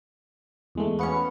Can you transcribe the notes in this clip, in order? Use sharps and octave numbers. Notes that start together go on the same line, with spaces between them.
E2 G#3 A3
B3 C#4 F#4 C#7